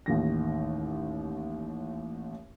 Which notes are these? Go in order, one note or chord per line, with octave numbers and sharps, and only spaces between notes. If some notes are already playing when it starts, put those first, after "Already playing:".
A1 D#2 D#3 A#6